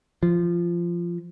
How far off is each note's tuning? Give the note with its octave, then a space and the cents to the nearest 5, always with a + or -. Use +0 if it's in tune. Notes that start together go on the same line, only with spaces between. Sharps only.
F3 -15